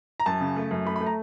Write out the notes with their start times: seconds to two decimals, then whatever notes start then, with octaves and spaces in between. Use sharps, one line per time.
0.20 A#5
0.26 F#2 A5
0.40 C#3
0.56 A3
0.71 F#2
0.85 A3 B5
0.96 B5
1.00 A3
1.07 A#5